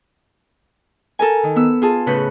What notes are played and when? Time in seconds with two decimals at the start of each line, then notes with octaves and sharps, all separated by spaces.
1.19 A4 A#4 G#5
1.44 D#3
1.56 B3 E6
1.82 F4 G#4 A5
2.07 A2 C#3 B4 F#6 G6